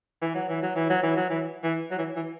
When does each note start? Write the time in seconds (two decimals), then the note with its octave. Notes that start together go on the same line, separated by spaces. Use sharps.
0.22 E3
0.35 F#3
0.49 E3
0.63 F#3
0.75 E3
0.90 F#3
1.03 E3
1.17 F#3
1.30 E3
1.64 E3
1.91 F#3
1.98 E3
2.16 E3